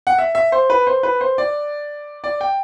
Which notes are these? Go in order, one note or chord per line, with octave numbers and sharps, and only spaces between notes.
F#5
E5
E5
C5
B4
C5
B4
C5
D5
D5
G5